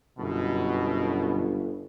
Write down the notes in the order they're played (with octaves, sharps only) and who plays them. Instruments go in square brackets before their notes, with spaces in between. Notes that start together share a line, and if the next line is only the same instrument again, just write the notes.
[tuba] G1 [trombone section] F#2 B2